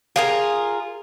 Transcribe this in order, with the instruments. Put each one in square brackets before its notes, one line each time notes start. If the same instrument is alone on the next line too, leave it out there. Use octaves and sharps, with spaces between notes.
[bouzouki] F4 G#4 A#4